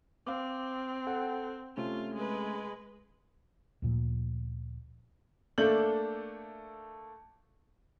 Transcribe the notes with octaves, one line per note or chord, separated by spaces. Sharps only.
C4 F5 D6
A4 F#5 G5
C3 A3 C#4 F4
G#3 B4
D2 A#2 F3
A3 A#3 D4 A4 G6 F#7